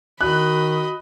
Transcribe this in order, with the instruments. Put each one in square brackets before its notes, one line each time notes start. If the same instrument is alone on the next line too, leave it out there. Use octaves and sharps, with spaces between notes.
[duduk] D#3 [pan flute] F#4 [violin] D#5 B5 [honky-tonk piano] F#6